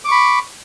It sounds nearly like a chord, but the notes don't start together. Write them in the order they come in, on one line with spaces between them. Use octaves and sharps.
D6 C#6 B5